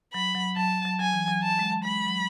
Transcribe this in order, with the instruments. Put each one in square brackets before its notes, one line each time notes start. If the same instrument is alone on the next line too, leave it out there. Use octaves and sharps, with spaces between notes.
[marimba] F#3 [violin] B5
[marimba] F#3
[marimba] F#3 [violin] A5
[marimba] F#3
[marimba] F#3 [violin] G#5
[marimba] E3
F#3
[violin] A5
[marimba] G#3
F#3
[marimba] G#3 [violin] B5
[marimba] F#3